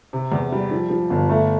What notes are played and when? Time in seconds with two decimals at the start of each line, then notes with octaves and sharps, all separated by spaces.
0.13 C3
0.32 E2
0.52 G3
0.71 F3
0.90 F3
1.10 G1
1.30 A3